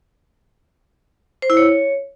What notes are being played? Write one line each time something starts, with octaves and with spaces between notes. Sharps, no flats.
C5
E4
C#5